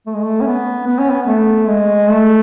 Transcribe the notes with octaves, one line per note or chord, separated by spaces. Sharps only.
A3
G#3
A3
C#4
B3
B3
C#4
B3
A3
G#3
A3